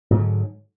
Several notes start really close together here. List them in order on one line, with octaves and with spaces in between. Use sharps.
G#2 F#3 D3